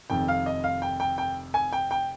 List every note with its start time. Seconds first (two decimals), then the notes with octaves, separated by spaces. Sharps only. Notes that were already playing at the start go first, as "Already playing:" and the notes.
0.10 F1 F2 D#3 G5
0.28 F5
0.46 D#5
0.64 F5
0.82 G5
1.00 G5
1.18 G5
1.54 G#5
1.73 G5
1.91 G5